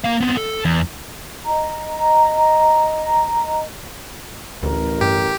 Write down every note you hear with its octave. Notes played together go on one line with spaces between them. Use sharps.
A#3 F5
B3 C4
A4
E2
D#5 A#5
A1 D2 A#4
G2 G4